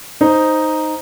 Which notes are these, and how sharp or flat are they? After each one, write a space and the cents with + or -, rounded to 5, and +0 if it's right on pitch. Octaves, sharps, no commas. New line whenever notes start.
D#4 +0 C5 +0